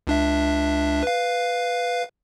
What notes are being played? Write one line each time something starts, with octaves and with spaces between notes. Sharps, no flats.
C#2 D4 E5
B4 F5